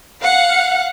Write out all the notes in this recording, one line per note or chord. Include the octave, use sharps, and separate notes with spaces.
F5 F#5